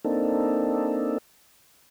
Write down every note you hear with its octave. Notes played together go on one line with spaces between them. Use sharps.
A#3 C4 D4 D#4 A4